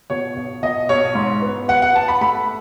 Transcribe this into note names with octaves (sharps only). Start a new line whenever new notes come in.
B2 C#5
B1
B2 D#5
B1 C#5
G#2
B3
B3 F#5
F#5
B3 A5
B5
A3 B5